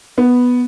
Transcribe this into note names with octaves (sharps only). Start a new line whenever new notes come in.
B3